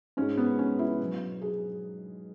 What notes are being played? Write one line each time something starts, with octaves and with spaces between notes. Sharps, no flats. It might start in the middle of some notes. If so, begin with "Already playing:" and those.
G#2 G#3 C#4
B3
C#4
E4
B2 F#3
G#4